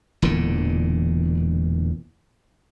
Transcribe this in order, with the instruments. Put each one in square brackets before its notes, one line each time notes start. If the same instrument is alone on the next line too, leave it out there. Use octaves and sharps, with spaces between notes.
[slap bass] E1 E2 A#2 D3